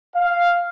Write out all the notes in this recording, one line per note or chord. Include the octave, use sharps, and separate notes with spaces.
F5